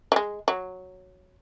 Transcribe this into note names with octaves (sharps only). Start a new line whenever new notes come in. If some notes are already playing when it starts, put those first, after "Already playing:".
F#3
G#3
F#3